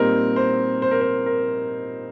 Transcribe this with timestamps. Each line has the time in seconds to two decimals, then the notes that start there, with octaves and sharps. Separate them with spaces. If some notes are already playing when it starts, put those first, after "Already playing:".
Already playing: A#2 G3 C4 D#4 A#4
0.36 C5
0.82 C5
0.91 A#4
1.01 C5
1.26 A#4